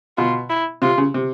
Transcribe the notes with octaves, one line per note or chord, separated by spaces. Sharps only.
B2 F4
E4
C3 F4
C#3
C3